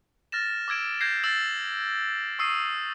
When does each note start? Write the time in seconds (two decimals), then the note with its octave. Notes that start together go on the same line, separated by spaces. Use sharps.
0.32 F6 A6 A#6 E7
0.68 D6 E6 G#6 D7 E7
1.01 G6 G#6 A#6 C7
1.23 E6 A6 C7 E7 F#7
2.39 C#6 D#6 E6 C7 D#7